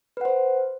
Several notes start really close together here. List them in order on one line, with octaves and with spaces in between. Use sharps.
B4 F#5 C5